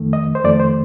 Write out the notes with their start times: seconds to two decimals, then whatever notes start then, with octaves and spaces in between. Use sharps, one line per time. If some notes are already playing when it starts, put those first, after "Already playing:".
Already playing: F2 D#3 A3
0.13 D#5
0.35 C5
0.44 F2 D#3 A3 D5
0.60 C5